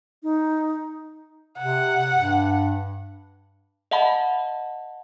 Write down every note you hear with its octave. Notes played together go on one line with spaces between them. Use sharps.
D#4
C3 F#5
G2
D#5 E5 F#5 A5 B5